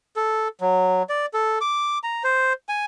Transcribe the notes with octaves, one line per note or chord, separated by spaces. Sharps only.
A4
F#3
D5
A4
D6
A#5
C5
G#5